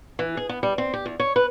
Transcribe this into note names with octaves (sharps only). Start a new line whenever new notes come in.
E3
G#4
B3
G3
C4
G4
E2
C#5
B4